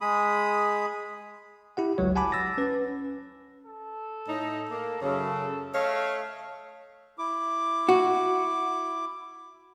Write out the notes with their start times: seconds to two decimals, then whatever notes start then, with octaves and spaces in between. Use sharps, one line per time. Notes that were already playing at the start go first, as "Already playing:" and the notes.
0.01 G#3 G#4 B5 D#6
1.77 E4 G4 F#5
1.98 G1 C#2 F#3 C#5
2.16 F#5 G#5 A5 B5 D6
2.32 E6 A6 A#6
2.58 C#4 B4
3.65 A4
4.28 A2 D#4
4.70 A#3
5.02 F#2 C#3 A4
5.74 A3 C#5 D#5 F5
7.18 E4 D6
7.89 F#4